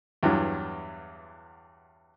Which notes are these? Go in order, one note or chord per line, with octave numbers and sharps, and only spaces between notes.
E2 G2 E3 F#3